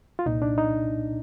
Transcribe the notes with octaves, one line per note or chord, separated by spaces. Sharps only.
F4
C2 A#2 D#4
D4
D#4